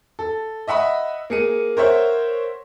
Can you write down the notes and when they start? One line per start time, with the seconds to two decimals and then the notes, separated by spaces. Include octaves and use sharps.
0.19 A4
0.68 D#5 E5 F#5 B5 D#6
1.30 A#3 G#4 C#7 D#7
1.77 A#4 C5 C#5 E5 F#5